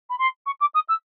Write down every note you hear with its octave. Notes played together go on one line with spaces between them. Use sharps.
B5
C6
C#6
D6
D#6
E6